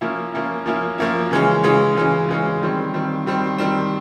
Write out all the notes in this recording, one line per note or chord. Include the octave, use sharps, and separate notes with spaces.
F3 A#3 C#4 E4
F3 A#3 C#4 E4
F3 A#3 C#4 E4
F3 A#3 C#4 E4
C#3 E3 G#3 C#4
C#3 E3 G#3 C#4
C#3 E3 G#3 C#4
C#3 E3 G#3 C#4
D#3 G3 C4
D#3 G3 C4
D#3 G3 C4
D#3 G3 C4